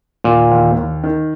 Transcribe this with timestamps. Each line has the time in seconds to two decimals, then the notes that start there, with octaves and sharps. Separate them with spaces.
0.24 D#2 A#2
0.51 D#2
0.77 D#2
1.03 D#3